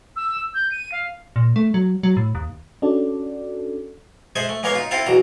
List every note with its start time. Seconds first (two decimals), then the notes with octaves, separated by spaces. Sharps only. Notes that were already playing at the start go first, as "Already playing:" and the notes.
0.16 E6
0.54 G6
0.72 D#7
0.92 F5
1.36 A#2
1.56 A3
1.74 F#3
2.03 F#3
2.17 A2
2.35 D#2
2.82 C#4 D4 F#4 A4 D5
4.36 G#3 G#4 A4 C5 E5
4.49 A3
4.63 G#3 A#3 B3 A#4 C#5 F5
4.75 D#4 F4
4.91 C4 E4 F4 A4 F5
5.06 B1 E2 B2 A#5